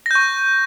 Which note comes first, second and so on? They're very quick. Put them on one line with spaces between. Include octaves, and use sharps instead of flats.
A#6 G6 C#6